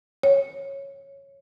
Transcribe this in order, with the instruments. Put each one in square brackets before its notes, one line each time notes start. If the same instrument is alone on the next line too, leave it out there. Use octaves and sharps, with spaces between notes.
[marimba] C#5